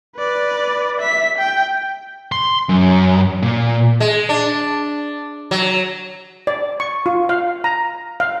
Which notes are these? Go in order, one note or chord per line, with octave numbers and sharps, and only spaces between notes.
B4 D5
E5 B6
G5
C6
F#2
A#2
G#3
D4
F#3
D5
C#6
F4
F5
A#5
F5